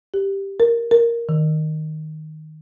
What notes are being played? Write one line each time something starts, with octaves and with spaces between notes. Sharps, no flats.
G4
A#4
A#4
D#3